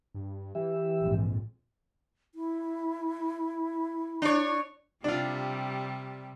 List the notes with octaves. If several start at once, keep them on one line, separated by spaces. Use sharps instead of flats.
G2
E3 G4 E5
A#1 F2 G#2
E4
D4 C#5
C3 G3 D4 F4